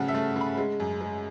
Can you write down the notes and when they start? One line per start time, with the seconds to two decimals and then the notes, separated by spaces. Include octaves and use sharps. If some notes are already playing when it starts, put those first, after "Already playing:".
Already playing: C#3 F#3 A3 C#4 F#5 A5
0.08 E5
0.15 A3
0.36 C#3 B5
0.58 G#3
0.80 F#2
1.01 G#3